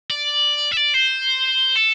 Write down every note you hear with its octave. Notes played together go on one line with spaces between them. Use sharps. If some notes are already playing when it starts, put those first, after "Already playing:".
D5
E5
D5
C5
A4